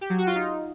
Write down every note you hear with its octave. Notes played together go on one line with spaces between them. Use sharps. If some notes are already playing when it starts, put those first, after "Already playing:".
G4
F#3
F#4
F4
D#4